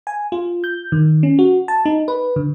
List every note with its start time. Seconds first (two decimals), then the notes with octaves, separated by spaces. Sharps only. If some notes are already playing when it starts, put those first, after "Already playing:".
0.07 G#5
0.32 F4
0.64 G6
0.92 D#3
1.23 C#4
1.39 F#4
1.68 A5
1.85 D#4
2.08 B4
2.36 D3